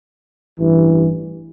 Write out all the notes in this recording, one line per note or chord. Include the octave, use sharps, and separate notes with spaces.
A1 G2 E3